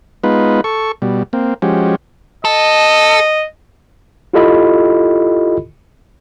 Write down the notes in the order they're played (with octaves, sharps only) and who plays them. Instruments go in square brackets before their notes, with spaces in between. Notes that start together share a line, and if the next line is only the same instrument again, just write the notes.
[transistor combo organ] G#3 B3 D#4 F4 B4
A4 C#6
B2 G3
A#3 C4
F3 G#3 C#4 F#4 G4
[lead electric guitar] A4 [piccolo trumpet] D#5
[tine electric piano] E4 F4 G4 A4 D#5 B5